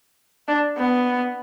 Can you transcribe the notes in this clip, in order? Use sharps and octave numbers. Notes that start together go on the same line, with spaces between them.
D4
B3